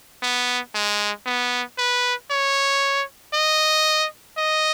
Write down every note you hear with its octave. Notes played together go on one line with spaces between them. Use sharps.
B3
G#3
B3
B4
C#5
D#5
D#5